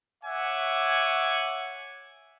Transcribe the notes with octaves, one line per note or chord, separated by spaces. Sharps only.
C#5 E5 F#5 G#5 D6